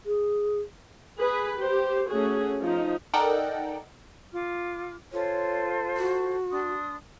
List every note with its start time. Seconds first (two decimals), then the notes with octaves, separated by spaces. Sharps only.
0.05 G#4
1.20 G#4 B4
1.58 G4 C5
2.09 A3 C#4 F#4 G#4
2.61 F3 D#4
3.14 D#4 A4 A#4 D5 F#5 G5
4.32 F4 D6 F6
5.12 F4 A4 C5 C#5
5.96 F#4
6.51 D4 C6 D#6